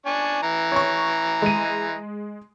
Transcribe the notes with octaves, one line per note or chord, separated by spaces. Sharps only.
D4 G#5 C#6
E3 A#5
C#5 C#6
G#3 D#7